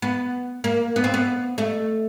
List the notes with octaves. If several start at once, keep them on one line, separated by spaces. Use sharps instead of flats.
B3
A#3
B3
C4
B3
A3